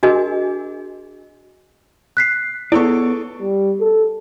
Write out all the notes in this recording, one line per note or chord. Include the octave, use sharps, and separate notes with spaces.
D4 F#4 G#4 A#4 D#5 G#5
F#6 B6 C7
B3 E4 G#4 A4 C#5 D5 C#6
G3
A4